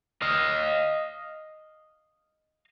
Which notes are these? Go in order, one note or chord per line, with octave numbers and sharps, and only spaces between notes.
D#5 F5